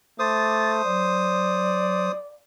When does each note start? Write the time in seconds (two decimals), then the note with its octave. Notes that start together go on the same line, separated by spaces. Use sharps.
0.19 A3 C5 D6 D#6 A6
0.85 F#3 D5